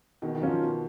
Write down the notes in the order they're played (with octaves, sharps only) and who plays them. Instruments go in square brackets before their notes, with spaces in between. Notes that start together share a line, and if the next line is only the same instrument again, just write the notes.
[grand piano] B2 [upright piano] D#3
[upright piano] D#3
[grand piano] F#3 C#4 F4
[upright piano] F3
[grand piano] B2